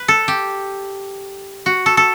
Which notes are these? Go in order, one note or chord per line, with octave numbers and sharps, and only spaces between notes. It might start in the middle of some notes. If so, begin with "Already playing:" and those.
Already playing: B4
A4
G4
F#4
A4
A4